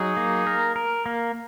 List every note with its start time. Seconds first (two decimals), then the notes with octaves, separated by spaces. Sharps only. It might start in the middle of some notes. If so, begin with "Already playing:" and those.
Already playing: F#3 D#4 G#4
0.17 A#3
0.47 A#4
0.76 A#4
1.06 A#3